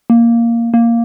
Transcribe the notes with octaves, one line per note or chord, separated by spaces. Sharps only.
A#3
A#3